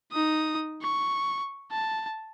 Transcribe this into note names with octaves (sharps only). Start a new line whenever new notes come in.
D#4 D#6
C#6
A5